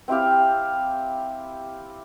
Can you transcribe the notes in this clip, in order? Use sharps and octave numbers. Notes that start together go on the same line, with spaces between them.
C4 E4 G4 F5